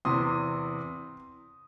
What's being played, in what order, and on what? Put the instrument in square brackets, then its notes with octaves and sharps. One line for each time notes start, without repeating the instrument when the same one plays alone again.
[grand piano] E2 C3 E3 C6 D#6